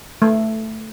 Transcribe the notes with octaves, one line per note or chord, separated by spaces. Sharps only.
A3